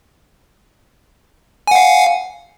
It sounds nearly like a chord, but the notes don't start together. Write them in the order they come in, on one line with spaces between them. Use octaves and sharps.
G#5 F#5 F5